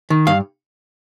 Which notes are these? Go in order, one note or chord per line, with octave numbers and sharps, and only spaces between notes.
D#3
G2 F5